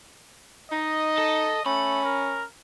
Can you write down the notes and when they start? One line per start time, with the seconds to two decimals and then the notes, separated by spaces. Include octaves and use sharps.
0.72 D#4 D#5
1.18 A4
1.66 A3 C#4 B5
2.04 A#4